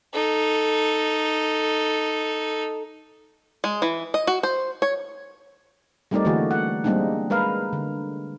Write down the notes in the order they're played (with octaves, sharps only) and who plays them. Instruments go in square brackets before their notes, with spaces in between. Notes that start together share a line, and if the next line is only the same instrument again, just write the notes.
[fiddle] D#4 A4
[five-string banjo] G#3
E3
D#5
F#4
C5
C#5
[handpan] G3 A3 C4 D#4 A#4 D5
D3 E3 A3 A#3 F#4 G#4
F#5
G3 G#3 A#3 C4 D4 D#4
G#3 A#4 B4 F5
D3